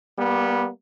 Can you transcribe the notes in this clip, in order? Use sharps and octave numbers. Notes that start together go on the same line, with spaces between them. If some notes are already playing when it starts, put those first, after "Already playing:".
G3 A#3 B3